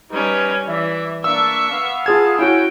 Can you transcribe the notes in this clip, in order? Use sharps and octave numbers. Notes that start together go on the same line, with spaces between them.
G3 C#4 D#4 B4
E3 D5 E5
A#3 D4 E5 C#6 E6
B3 F5
F4 G#4 A5 G#6
C#4 E4 F#4 G5